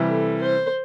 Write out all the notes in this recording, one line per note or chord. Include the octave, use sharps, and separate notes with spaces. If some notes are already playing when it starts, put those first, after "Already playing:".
Already playing: C3 E3 G3 E4
A4
C5